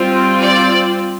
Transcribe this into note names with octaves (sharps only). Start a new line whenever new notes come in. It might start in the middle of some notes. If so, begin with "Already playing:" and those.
Already playing: G3 C4 F4
D5